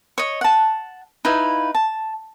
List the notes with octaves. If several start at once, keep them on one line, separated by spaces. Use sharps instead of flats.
C#5 D#5
F#5 A5
D#4 E4 B4 F5
A5